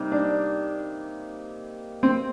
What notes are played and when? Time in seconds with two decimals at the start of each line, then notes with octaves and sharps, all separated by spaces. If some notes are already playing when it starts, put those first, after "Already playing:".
Already playing: C3 G3 A#3 D#4
0.12 D4
2.03 C4